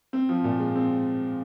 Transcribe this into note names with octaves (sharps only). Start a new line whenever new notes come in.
C4
F3
A#2
G#3
C4